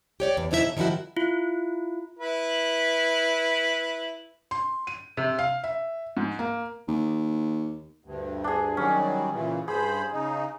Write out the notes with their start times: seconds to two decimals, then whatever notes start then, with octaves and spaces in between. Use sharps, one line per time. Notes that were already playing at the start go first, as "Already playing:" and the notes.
0.20 G4 C#5 D5
0.37 E2
0.51 F2 B2 D#4 E4 F#4 E5
0.63 C#3
0.77 D#3 F3 G3 E4 F#4
1.17 E4 F4
2.19 E4 B4
4.51 C6
4.87 D#7
5.17 C3
5.39 F5
5.64 E5
6.17 G#2
6.39 A#3
6.88 D#2
8.05 D2 G2
8.44 D4 G#4
8.77 D#3 F#3 G3 C#4
9.32 A#2 C#3 E3
9.68 G2 G#4 C5 B5
10.12 C#3 D#4